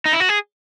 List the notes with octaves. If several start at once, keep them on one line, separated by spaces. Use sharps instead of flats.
D#4
E4
F#4
G#4